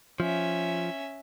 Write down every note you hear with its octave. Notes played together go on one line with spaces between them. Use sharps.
F3 C#4 E5